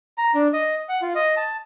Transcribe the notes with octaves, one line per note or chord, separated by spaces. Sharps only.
A#5
D4
D#5
F#5
F4
D#5
A5